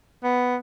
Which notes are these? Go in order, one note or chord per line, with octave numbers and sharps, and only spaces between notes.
B3